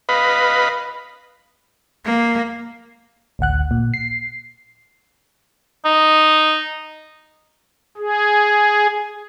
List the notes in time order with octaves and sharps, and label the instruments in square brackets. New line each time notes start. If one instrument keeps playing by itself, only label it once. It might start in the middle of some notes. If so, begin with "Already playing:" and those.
[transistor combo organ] B4 D#5 F5 B5
[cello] A#3
[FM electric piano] A1 D2 F#5 F#6
A#2
C7
[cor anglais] D#4
[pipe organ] G#4